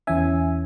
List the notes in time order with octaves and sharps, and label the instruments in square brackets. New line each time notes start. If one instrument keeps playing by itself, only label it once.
[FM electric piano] E2 E3 C#4 E5 G#5